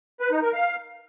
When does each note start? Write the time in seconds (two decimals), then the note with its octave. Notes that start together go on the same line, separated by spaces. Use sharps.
0.20 B4
0.31 D#4
0.42 A#4
0.53 F5